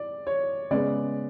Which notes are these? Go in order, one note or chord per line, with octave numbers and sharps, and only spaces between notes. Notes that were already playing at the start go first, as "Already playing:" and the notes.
Already playing: D5
C#5
C#3 G#3 B3 D5